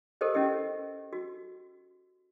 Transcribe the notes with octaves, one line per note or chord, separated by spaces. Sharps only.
G4 A4 A#4 C5 D#5
C#4 E4 G4 D#5
F#4